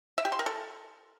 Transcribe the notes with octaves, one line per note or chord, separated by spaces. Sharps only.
E5
G4
C6
A#4
A4